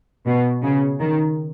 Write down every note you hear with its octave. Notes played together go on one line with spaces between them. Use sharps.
B2
C#3
D#3